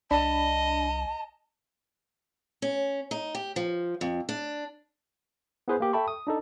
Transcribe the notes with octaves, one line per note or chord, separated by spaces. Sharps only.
C2 D4 D#5 A5 B5
C#4
D#4
G4
F3
F2
D4
B3 E4 G#4 B4 C5
A#3 G4
A4 E5 G5 A5 B5 C#6
D#6
D4 D#4 A4